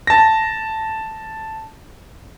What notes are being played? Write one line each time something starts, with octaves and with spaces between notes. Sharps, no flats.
A5 A#6